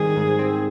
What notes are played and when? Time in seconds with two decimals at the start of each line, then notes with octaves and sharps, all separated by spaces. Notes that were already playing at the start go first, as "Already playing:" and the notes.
Already playing: G#2 D#3 G3 C4 G#4
0.16 G#2
0.39 C4